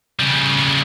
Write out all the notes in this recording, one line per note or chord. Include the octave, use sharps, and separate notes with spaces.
C#3 G3